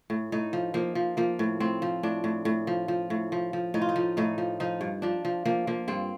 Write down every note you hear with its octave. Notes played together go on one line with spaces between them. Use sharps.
A2
A2 D#4
F3
F3 A#3
F3
F3 A#3
A2
A2 C4
F3
A2 D4
A2
A2
F3
F3
A2
F3
F3
A2 D#4
F4
D#4
F3
A2 D#4
F3
F3 D#4
G2
F3 D4
F3
F3 A#3
F3 A#3
G2 C4